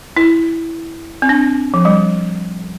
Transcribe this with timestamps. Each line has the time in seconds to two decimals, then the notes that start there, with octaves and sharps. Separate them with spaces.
0.17 E4
1.22 C4
1.29 D4
1.74 F3
1.85 G3